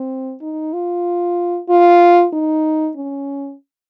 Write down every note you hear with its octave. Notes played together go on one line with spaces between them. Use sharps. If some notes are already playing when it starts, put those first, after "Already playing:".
Already playing: C4
D#4
F4
F4
D#4
C#4